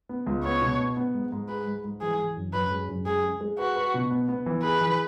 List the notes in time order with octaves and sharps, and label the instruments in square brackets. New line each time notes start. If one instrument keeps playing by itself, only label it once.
[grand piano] B3
C#2
[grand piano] B3 [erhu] C#5
[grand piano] B2
B3
B3
G#2
G#2
[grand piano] G#4 [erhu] B4
[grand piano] G#2
G#2
[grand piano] E3 [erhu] G#4
[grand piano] E3
F#2
[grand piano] F#2 [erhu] B4
[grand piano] G#3
F#2
[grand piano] G#3 [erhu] G#4
[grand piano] G#3
G#3
[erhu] F#4 [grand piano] B4
[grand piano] B4
B2
B3
B3
E3
[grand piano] G#4 [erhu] B4
[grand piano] E3